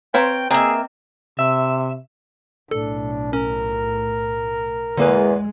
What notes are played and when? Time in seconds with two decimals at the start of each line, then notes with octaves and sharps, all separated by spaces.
0.14 C4 B4 C#5 F5 G5 A#5 C6
0.51 A#3 C4 G#4 D#5 E5
1.39 C3 E5
2.71 B1 A2 D4 A4
3.33 C#4 A#4
4.97 E2 D3 G#3 A#3 B4